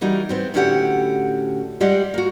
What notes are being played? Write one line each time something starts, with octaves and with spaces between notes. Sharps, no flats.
E3 G3 D#4 F#4 A#4
B3 C4 G4
A2 D3 C#4 F#4 G4 F#5
G3 G#3 G4 D5 D#5 F#5
A#3 F#4